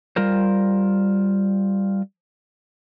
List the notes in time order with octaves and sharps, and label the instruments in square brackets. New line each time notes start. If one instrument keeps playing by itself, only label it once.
[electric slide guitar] G3 F4 A#4 C5